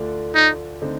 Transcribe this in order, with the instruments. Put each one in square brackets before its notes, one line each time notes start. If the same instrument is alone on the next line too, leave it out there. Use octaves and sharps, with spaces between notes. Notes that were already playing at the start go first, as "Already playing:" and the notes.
Already playing: [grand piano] D2 D3 A3 D4 F4
[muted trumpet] D#4
[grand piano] D3 A3 C4 D#4